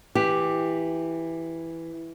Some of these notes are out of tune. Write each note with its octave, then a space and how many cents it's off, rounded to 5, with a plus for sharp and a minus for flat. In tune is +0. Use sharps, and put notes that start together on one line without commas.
E3 +0 G4 +0